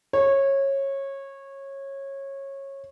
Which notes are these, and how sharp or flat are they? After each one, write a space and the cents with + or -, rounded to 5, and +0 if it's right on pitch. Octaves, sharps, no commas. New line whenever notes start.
C#5 -20